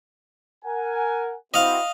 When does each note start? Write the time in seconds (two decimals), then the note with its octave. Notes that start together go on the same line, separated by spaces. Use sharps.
0.65 A#4 F#5 G#5
1.54 C4 E4 F#4 D#5 F5